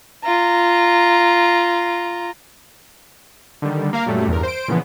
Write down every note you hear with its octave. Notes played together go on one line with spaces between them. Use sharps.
F4 A#5
D3 D#3 G3
A#3 A#4 F5
F#2 A#2 F#3 G3 A3
E2 G2 A#4
C5 D7
A#2 C#3 E3 F3 B3